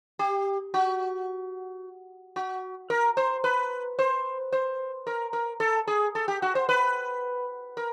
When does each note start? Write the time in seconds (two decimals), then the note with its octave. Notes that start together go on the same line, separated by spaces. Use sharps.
0.19 G4
0.74 F#4
2.36 F#4
2.90 A#4
3.17 C5
3.44 B4
3.99 C5
4.52 C5
5.07 A#4
5.33 A#4
5.60 A4
5.88 G#4
6.15 A4
6.28 G4
6.42 F#4
6.55 C5
6.69 B4
7.77 A#4